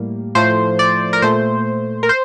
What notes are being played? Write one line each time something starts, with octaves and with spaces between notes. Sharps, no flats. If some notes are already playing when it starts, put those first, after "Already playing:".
Already playing: A2 G3 A#3
A2 F3 A3 C5
D5
A#4
A#2 A3 C5
A#4
C5